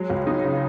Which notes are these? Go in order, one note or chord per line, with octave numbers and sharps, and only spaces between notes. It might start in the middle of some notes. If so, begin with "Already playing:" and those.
Already playing: F#3 G#3
C#2
D#4
C#3